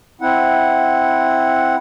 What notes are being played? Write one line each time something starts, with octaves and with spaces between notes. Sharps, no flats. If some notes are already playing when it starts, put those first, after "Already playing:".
C4 E4 F#5